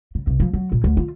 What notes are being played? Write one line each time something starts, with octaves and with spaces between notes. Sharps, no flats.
C#3
C2
F3
F#3
A#2
D2
F4